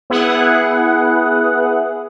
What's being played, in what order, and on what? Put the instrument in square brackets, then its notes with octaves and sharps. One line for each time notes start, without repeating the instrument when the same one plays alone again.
[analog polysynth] B3 E4 G#4 F#5